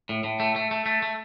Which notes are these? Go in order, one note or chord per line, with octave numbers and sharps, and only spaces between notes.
A2
A2
A3
A3
A3
A3
A3